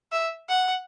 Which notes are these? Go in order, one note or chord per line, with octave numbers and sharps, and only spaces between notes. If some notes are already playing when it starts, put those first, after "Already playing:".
E5
F#5